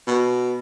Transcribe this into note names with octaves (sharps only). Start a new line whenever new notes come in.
B2